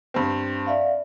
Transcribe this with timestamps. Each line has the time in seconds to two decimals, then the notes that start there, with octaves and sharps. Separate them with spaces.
0.14 G2 C4
0.67 D5 E5 F5